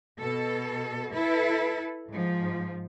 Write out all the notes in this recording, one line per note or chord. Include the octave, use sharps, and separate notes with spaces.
B2 A4
E4 A4 B4
G#2 F3